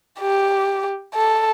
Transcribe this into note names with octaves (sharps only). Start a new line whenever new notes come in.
G4
A4